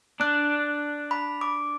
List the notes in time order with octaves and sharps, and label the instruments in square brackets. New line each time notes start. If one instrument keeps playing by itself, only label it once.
[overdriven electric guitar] D4 [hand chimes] F#6
[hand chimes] B5
D6